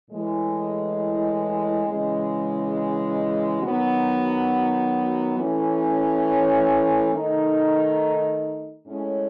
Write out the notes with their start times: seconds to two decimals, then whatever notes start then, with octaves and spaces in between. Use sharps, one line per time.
0.10 A2 E3 G#3
1.86 C#3 E3 G#3
3.60 D#3 F#3 B3 F#4
5.36 E3 A3 C#4
7.11 D#3 A3 D#4
8.87 A2 G#3 C#4